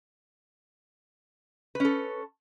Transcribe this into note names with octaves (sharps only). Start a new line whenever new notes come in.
C#4 A4 B4